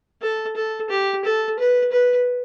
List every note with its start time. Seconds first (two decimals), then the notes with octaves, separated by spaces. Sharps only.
0.22 A4
0.56 A4
0.90 G4
1.25 A4
1.59 B4
1.92 B4